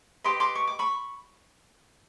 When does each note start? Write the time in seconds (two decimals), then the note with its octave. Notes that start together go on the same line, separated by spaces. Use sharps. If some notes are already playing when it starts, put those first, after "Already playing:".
0.24 G4 B4 D#5 C6 D6
0.40 C6 D6
0.55 C#6
0.67 D6
0.79 B5 C#6